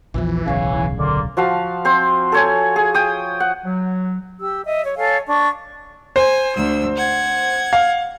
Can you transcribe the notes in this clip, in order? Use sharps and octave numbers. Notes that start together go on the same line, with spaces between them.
A#1 E2 E3 F3
D1 B1 C#3 C#5 F5 G#5
D3 A#3 D5 C6
F3 F#4 F5 A5
C4 C5
A4 C#5 G#5
G#4
G5 D#6
F#5
F#3
G4 E6
D#5 E5
C#5
A4 C#5 F5 G#5
D4 C#6
C5 G#5
D2 E6
F#5 G#6
F5